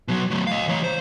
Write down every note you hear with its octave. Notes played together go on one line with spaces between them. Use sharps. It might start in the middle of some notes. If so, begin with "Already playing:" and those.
B2 F#3
F#3 A3
D#5 F5
E3 C#5
C5